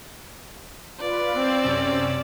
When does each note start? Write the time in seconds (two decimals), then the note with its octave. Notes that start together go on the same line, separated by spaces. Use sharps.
1.00 F4 B4 D5
1.34 C4 E6
1.64 F#2 C3 C#4